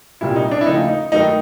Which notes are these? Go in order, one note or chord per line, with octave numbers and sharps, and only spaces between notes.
C2 A#2 G3 E4
D#4
D4
E4
D#2 C#3 F3 A3 D#4
D#4
G2 D#3 F#3 A3 D#4